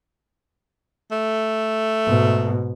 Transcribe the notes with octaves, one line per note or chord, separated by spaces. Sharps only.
A3
G#2 B2